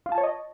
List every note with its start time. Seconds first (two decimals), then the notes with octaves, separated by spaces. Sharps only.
0.06 F4
0.12 A5
0.18 C#5
0.24 D#5